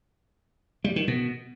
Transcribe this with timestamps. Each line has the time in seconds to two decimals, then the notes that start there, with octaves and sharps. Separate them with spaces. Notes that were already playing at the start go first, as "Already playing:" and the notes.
0.84 G3
0.96 D#3
1.08 B2